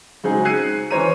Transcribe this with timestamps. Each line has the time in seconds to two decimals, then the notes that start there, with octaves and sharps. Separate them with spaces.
0.24 C#3 F#3 G#3 C4 D#4 G#4
0.45 E6 F#6 G#6 C7 C#7 D#7
0.91 E3 C#4 C5 C#5 A#5 D#7